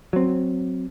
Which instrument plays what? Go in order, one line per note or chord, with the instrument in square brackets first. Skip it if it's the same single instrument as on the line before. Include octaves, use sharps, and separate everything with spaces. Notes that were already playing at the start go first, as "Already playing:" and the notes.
[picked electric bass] F#3 C4